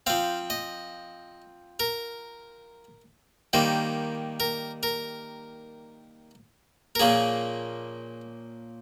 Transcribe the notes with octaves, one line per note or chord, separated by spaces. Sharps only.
F3 C4 F5
D#5
A#4
D#3 G3 A#3 C5
A#4
A#4
A#4
A#2 F3 A#3 C#4 G#4